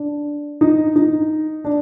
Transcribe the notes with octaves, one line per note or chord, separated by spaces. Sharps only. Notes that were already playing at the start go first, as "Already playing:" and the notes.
Already playing: D4
D#4
D#4
D4